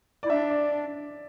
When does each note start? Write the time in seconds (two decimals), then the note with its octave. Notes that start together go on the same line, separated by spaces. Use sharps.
0.23 E4 D5
0.30 D4 E5
0.50 D5